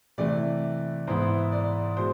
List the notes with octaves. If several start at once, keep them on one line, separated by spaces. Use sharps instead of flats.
C3 E3 A3 D5
G#2 E3 B3 E4 C5
D5
B2 G#3 C5